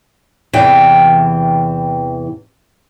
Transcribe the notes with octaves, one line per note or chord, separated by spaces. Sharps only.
E2 C3 E3 G5